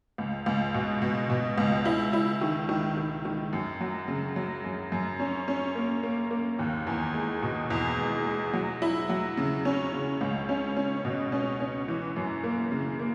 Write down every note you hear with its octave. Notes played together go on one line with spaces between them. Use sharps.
C#2
C#2
B2
B2
B2
C#2
E4
E4
D#3
D#3
D#3
D#3
F#2
F#3
C#3
F#3
F#2
F#2
C#4
C#4
A#3
A#3
A#3
D#2
E2
G#3
B2
E2
G#3
G#3
F#3
E4
F#3
C#3
C#4
C#3
C#2
C#4
C#4
B2
C#4
C#4
E3
F#2
A#3
C#3
A#3